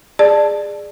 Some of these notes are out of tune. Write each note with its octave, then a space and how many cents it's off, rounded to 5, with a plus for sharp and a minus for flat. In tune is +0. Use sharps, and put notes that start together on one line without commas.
G#4 -10 D5 +20 A5 +0